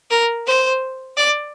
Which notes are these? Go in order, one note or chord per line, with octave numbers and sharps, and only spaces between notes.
A#4
C5
D5